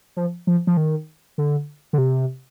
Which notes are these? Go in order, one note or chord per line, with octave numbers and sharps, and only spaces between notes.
F3
F3
F3
D#3
D3
D3
C3